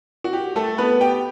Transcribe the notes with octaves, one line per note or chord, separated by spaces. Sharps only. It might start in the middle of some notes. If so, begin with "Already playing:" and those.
F#4
G4
A3 A4
B3 B4
G4 G5